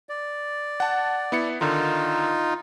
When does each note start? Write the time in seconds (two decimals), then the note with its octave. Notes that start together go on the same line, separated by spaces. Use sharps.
0.09 D5
0.80 F#5 A5
1.32 B3 E4 C#7
1.61 D3 D#3 D#4 F4